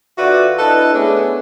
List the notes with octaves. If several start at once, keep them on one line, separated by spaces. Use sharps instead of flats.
D3 F4 F#4 B4 D5 E5
D4 E4 A4 B4 D#5 A5
A3 B3 C#4 D4 G#4